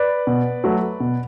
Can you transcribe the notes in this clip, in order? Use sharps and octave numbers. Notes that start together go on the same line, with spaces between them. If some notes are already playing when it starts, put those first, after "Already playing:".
Already playing: B4 D5
B2
F#3 A3
B2